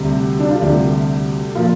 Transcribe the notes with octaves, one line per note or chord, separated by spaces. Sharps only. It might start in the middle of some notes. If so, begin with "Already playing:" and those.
Already playing: D2 C3 G3 G4
D4
F4
D2 C3 G3 D4 G4
A#2 F3 A#3 F4